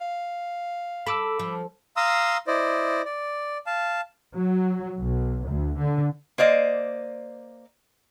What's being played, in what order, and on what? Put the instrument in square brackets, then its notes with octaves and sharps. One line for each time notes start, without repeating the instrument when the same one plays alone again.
[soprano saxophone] F5
[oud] A4 [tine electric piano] B5 D6 E6
[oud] F3
[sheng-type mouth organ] F5 A#5 C6 D#6 E6
E4 C5 D5 D#5
D5
F5 A5
[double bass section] F#3
B1
D2
D3
[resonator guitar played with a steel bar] A#3 C5 D5 D#5